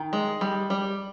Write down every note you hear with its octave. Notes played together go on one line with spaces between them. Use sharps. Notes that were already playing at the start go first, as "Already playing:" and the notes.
Already playing: D#3 G5
G#3
G3
G3